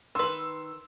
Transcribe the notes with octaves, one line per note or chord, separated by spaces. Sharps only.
D#3 B4 C6 E6